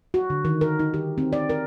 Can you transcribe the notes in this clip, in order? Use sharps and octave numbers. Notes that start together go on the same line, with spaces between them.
F#4
D3
D#3
A#4
D#4
G4
C4
D5
A#4